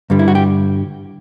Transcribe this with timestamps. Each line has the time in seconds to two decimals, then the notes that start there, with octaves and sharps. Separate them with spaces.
0.10 G2 D3 G3
0.19 E4
0.28 F#4
0.35 G4